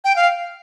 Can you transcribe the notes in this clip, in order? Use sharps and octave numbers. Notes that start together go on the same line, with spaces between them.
G5
F5